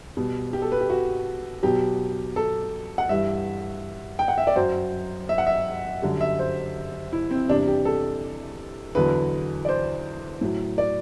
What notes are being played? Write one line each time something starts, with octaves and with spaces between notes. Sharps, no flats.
B2 G3
G4
A4
B4
G4
F#4
B2 F#3 G4
A4
F#5
G2 E3 G3 E5
G5
F#5
E5
D5
F#2 F#3 C5
E5
F#5
E5
F#2 D3 G3
E5
C5
E4
C4
E2 C3 G3 D4
G4
A4
E2 D3 F#3 B4
D5
C5
A2 F#3
D5